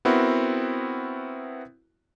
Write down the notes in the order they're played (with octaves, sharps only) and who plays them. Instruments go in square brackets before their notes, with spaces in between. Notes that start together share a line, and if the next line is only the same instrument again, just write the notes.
[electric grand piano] B3 C4 E4 F#4 A#4